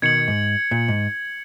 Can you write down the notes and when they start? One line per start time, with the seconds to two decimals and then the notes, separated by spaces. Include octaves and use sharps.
0.02 B2 D#3 G#6 C#7 F#7
0.28 G#2
0.71 A#2
0.88 G#2